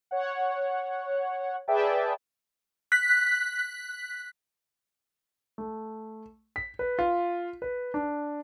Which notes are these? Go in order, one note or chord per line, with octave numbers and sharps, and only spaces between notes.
C#5 F#5
G#4 B4 D5 E5 G5 A5
F#6 B6
A3
B6
B4
F4
B4
D4